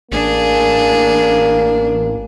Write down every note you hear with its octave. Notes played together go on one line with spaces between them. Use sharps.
A1 A#3 D4 G#4